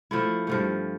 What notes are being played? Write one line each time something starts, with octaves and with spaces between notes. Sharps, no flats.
F3 A3 E4
G2 F3 A3